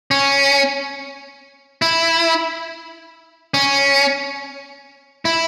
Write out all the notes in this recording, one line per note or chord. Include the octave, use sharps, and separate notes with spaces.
C#4
E4
C#4
E4